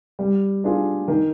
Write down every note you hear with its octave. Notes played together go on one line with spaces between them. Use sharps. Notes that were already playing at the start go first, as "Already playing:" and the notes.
G3
D4 F4 G#4
D#3